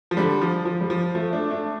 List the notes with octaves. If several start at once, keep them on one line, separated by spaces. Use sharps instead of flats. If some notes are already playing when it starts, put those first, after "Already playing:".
F3
D3 G3
F3
F3
G3
F3
F3 A3
A3 D4
A3 D4